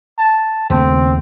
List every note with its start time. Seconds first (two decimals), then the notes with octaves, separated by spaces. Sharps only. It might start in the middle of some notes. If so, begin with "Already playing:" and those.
0.19 A5
0.70 D#2 C#3 A3 C4